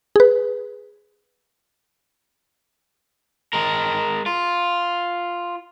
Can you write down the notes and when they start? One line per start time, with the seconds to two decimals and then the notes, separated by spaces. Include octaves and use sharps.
0.16 G#4 B4
3.53 G#3 A#4
4.26 F4